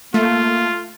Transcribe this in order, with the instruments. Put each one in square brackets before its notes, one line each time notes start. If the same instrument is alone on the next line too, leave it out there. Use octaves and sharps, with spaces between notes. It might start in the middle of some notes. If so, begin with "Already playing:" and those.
[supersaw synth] A3 [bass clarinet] A#3 [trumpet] F4